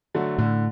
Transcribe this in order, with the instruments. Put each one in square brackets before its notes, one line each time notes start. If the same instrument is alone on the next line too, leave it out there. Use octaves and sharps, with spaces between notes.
[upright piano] D3 F#3 A3
[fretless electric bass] A2 [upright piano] D3